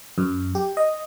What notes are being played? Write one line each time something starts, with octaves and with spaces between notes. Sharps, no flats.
F#2
G4
D#5